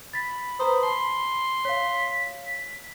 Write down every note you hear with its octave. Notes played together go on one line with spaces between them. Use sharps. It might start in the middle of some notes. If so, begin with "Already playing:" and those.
B5 A6 B6
B4 C5 A#5 D#6
A5 C6
C#5 F5 B6